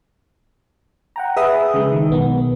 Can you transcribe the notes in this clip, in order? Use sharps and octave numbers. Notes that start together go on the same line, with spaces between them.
F#5 G5 A#5
G#4 B4 E5 D#6
C#3 G#3
D#3
B1 B3